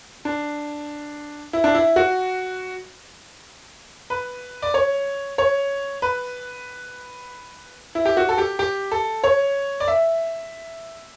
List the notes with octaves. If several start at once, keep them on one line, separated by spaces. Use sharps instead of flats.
D4
E4
D4
E4
F#4
B4
D5
C#5
C#5
B4
E4
G4
F#4
A4
G4
G4
A4
C#5
D5
E5